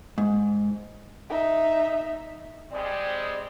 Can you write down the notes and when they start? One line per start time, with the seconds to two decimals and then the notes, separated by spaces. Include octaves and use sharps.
0.18 G#2
1.29 D#4 E5
2.72 G3 G#3 C4 D5